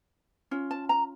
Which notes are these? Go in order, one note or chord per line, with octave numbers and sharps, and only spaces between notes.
C#4 F4
A5
A#5